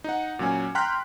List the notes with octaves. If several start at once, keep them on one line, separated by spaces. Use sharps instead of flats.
D#4 F#5
A#2 F#3 C#4 G#5
G5 A#5 C6 F6 F#6 B6